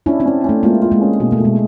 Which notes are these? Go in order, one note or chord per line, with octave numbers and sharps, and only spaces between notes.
C#4 D4 E4
C4 D4
C#4
A3 C#4
G#3 A#3 F4
F4
G#3 A#3
C#4
B2 A#3
A3
B2 G#3